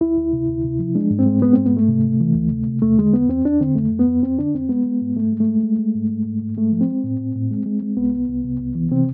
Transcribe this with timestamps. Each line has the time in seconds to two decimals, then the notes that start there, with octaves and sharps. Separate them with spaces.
0.01 D2 E4
0.18 D2
0.33 C3
0.48 D2
0.64 C3
0.79 F3
0.95 G#3 D4
1.10 G#2
1.19 C4
1.26 G#3
1.42 G#3 B3
1.53 G#2 C4
1.66 B3
1.73 G#2 A3
1.88 C3
2.04 C3
2.20 E3
2.35 D2
2.51 C3
2.67 C3
2.82 E2 A3
2.98 D3 G#3
3.13 E2 B3
3.29 E2 C4
3.44 E2 D4
3.60 D3 C4
3.76 F2 A3
3.91 F2
3.99 B3
4.07 F2
4.23 F2 C4
4.39 D3 D4
4.54 F2 C4
4.69 G#3 B3
4.86 G#3
5.01 G#2
5.16 G#2 A3
5.32 G#3
5.40 A3
5.48 G#3
5.63 G#3
5.79 G#3
5.94 G#2
6.10 G#3
6.26 G#2
6.42 G#2
6.57 G#3 A3
6.72 F3
6.81 C4
6.89 G#3
7.04 A2
7.20 A2
7.35 A2
7.51 G#3
7.66 G#3
7.82 G#3
7.97 C2 B3
8.13 C2
8.28 C2
8.44 C3
8.60 C2
8.75 E3
8.91 C3 C4